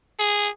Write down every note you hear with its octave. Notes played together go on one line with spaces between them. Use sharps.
G#4